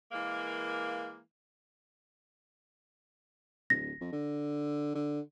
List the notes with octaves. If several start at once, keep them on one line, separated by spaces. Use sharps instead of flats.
E3 G#3 A#3
D1 A#6
F2
D3
D3